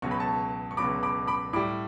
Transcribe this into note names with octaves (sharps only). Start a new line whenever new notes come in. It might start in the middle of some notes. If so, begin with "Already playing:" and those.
C#2 B2 F#3 C#6
B5
A5 C#6
C#6
C#2 B2 F#3 B5 D6
B5 D6
B5 D6
A2 G3 B5 D6